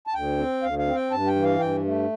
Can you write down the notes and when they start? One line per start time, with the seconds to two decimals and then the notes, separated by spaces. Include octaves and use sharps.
0.07 A5
0.14 D2 G5
0.38 C4
0.62 D2 F5
0.79 F5
0.86 C4
0.95 G5
1.11 G2 A5
1.27 G5
1.36 E3
1.44 F5
1.59 G2 G5
1.85 A3